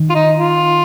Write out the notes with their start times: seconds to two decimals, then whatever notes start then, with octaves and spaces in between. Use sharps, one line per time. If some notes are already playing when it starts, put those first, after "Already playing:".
Already playing: D#3
0.10 F4
0.14 D#4
0.37 F4